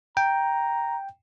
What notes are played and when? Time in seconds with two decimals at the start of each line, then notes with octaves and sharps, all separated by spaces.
0.17 G5 A#5